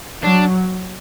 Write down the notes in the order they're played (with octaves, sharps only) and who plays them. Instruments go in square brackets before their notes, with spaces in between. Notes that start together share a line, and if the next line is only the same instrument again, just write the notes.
[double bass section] F#3 [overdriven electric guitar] D4